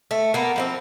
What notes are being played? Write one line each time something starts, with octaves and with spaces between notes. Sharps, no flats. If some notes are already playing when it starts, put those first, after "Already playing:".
A3
A#3 B3
F3 A3 C4